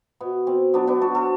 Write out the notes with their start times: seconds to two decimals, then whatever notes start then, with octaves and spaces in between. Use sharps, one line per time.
0.21 B2 B3
0.47 B2 C4
0.74 F#3 B3 D4
0.87 B3 D4
1.01 B2 F#4 A4
1.15 A4 C5